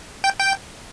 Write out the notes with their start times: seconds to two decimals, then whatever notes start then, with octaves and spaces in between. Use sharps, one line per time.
0.24 G5
0.39 G5